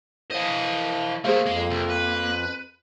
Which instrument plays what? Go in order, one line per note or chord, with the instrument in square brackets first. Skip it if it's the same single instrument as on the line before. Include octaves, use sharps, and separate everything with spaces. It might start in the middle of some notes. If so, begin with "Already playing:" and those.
[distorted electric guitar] E3 D#5 [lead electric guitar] C5 F5
[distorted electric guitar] A3 A#3 [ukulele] G#4 C5 F5
[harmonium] F2 [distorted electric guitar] G#3 [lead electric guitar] A#3
[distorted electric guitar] C2
B4